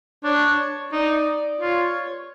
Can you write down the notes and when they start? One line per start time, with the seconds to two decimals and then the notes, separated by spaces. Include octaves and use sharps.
0.24 D4 C#5
0.92 D#4 D5
1.60 F4 C#5